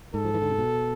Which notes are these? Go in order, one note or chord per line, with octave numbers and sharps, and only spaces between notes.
G#2 A4
F3
E3
D3
C3
B2